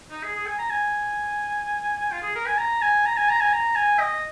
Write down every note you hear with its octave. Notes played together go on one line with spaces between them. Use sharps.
D#4
G#4
G#4
G#5
A#5
G#5
F4
G#4
A#4
G#5
A#5
G#5
A#5
G#5
A#5
G#5
A#5
G#5
D#5